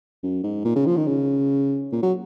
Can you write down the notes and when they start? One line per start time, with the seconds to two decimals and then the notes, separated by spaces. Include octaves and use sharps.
0.23 F#2
0.43 G#2
0.65 A#2
0.76 C#3
0.87 F3
0.97 D#3
1.07 C#3
1.92 A#2
2.03 F#3